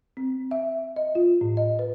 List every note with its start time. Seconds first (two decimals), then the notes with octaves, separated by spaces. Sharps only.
0.17 C4
0.51 E5
0.96 D#5
1.15 F4
1.41 A2
1.57 D#5
1.79 B4